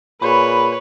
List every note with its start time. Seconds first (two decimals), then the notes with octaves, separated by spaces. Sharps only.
0.22 A#2 G#4 B4 C#5 B5